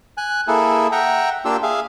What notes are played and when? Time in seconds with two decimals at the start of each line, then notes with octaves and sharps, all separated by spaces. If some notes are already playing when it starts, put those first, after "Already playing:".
0.18 G#5 F#6
0.48 A#3 E4 G#4 A4
0.92 E5 F#5 G5 A#5
1.45 A#3 D4 F4 G4 E6
1.63 G#4 E5 F5